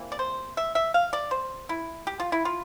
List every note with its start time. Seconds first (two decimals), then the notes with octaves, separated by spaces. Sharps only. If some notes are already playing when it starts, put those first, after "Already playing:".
Already playing: C3 E3 A#3
0.12 D5
0.19 C5
0.57 E5
0.75 E5
0.94 F5
1.13 D5
1.31 C5
1.69 E4
2.07 G4
2.20 F4
2.32 E4
2.45 F4